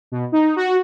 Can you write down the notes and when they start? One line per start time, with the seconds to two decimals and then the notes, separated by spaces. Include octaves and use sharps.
0.12 B2
0.32 D#4
0.56 F#4